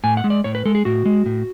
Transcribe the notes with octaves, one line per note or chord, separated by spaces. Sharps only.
A2 G#5
F#5
G#3
D5
A2 C#5
B4
G#3 A4
G#4
A2 F#4
G#3
A2